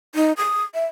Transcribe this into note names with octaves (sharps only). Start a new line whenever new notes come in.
D#4
D#6
E5